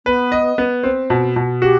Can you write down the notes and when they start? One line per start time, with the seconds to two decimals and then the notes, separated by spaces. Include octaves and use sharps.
0.06 B3 B4
0.32 D#5
0.58 B3
0.83 C4
1.10 B2
1.36 B2
1.62 F#4 G4